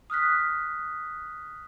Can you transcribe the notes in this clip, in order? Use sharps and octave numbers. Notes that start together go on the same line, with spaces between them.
D#6 F6 F#6 B6